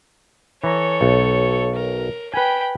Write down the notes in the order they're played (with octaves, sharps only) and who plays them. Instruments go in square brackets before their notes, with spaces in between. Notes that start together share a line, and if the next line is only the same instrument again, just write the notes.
[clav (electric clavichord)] E3 A#5 [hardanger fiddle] A4 C#5
[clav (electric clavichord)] B1
[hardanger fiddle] A#4
[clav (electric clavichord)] B4 G#5 [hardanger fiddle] G5 B5